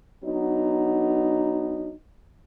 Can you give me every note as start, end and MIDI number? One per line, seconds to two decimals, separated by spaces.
0.23 1.92 54
0.23 1.92 59
0.23 1.92 62
0.23 1.92 63